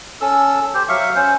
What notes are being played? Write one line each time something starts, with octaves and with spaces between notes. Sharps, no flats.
C#4 A4 E6
G4 C5
F#3 E5 F5 C#6
C#4 C5